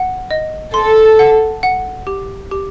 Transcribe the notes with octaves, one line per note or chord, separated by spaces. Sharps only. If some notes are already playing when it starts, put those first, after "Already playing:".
Already playing: F#5
D#5
A4 C6
F#5
F#5
G4
G4